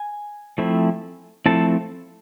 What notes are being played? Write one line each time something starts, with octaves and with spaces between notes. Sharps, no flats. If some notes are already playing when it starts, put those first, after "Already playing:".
Already playing: G#5
F3 A3 C4 E4
F3 A3 C4 E4 A5